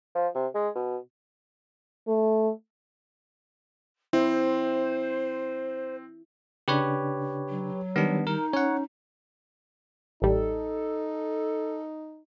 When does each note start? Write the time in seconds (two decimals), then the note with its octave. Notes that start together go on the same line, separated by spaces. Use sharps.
0.15 F3
0.35 C3
0.55 G#3
0.75 B2
2.08 A3
4.13 C4 E4 C5
6.68 C#3 D4 G4 B4 C#5
7.49 F#3
7.96 D#3 G3 B3 D4
8.27 D#4 A#4
8.53 C#4 C#5 F#5
10.22 A1 G3 D#4 A4